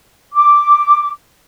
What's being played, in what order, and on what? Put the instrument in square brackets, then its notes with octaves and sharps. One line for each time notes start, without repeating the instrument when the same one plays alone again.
[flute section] D6